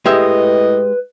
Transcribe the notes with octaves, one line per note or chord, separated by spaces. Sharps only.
A2 G#3 G4 B4 D#5 E5